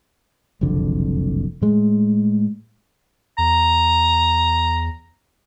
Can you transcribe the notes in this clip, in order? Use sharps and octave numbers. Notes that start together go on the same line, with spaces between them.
F#1 C2 F2 D3
A2 G#3
E2 A#5